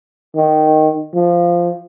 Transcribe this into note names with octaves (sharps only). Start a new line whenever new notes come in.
D#3
F3